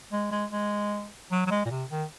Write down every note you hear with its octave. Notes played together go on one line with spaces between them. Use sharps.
G#3
G#3
G#3
F#3
F#3
G#3
A#2
C3
D#3